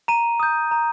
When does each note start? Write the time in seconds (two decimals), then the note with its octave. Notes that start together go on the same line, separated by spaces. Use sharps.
0.08 A#5 D#7
0.40 D#6 G6
0.71 A#5